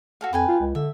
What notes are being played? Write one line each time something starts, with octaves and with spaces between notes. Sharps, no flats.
F#4 A4 F5
F2 B4 G5 G#5
F4
C#2
D3 E5